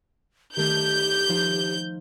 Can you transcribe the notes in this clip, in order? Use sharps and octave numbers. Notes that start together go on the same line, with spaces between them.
D#3 A3 G4 G6
F3 D#4 F5